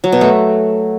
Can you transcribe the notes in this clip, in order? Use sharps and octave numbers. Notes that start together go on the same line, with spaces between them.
F#3
B2
A3